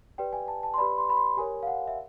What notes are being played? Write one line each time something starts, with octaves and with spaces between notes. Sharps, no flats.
G4 B4 D5 G5
G#5
A5
A5
C6
G4 B4 D5 B5
C6
B5
C6
G4 A#4 C#5 G#5
F5
F#5
E5